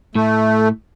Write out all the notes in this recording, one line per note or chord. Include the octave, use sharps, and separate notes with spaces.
A2 A3